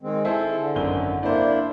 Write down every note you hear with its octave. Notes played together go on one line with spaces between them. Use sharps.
D#3 G#3 C4
E4 G#4 A4 C5
D3
G#1 F#2 G7
A#3 D4 E4 C5 D5